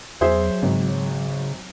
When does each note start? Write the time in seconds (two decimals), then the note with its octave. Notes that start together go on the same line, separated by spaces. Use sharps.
0.21 E2 F#3 G#4 C5 E5
0.63 G#1 C#3